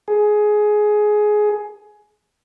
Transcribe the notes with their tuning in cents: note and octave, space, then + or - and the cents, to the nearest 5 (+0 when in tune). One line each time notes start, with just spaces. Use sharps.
G#4 +15